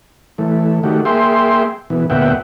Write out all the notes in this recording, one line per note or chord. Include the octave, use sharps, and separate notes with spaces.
E3 A3
D#3 A3 F#4 G4
A#3 G#4 E5 G5 C6
B2 E3
D2 A#2 B3 E5 F#5 G5